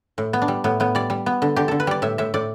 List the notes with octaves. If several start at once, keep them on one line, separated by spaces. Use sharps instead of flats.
A2
B3
D4
G3
A2 B3
A2 B3
G3 D5
G3
B3
D3
D3 G4
D3 A4
B4
G3 D5
A2 E5
A2 E5
A2 D5